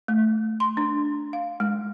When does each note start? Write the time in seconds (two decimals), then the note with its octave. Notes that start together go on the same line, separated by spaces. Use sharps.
0.08 A3
0.60 C6
0.77 D4
1.33 F5
1.60 G#3